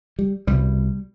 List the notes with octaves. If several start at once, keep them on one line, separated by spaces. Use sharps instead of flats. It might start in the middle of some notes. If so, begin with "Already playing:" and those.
G3
C2 B2 G3